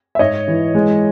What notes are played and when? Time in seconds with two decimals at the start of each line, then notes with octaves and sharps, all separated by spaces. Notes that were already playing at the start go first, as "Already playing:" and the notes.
0.15 E5
0.19 G#2 C#5 D#5
0.48 E3
0.75 G#3